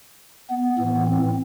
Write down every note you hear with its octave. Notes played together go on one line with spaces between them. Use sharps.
B3
A2 E3 B3
C4